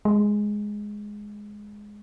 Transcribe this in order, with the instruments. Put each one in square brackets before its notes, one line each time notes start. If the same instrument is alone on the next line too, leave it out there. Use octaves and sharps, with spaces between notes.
[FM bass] G#3